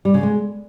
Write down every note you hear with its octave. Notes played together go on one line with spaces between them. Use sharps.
G3
C#3
G#3